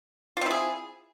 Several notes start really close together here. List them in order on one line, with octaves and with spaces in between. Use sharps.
F4 C4 E4 G#4